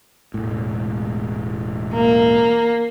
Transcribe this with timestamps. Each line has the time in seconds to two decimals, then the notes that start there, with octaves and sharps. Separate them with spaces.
0.34 E1 A2
1.94 A#3